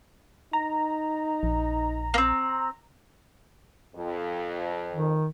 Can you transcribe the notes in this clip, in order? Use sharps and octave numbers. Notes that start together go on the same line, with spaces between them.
D#4 A#5
A#1
A#3 C4
F2
D#3